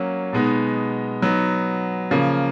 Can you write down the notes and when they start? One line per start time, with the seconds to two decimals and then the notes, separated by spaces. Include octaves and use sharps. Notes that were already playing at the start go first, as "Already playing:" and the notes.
Already playing: F#3 A#3 C#4
0.33 B2 G#3 B3 D#4
1.22 F#3 B3 D#4
2.11 C#3 F3 A#3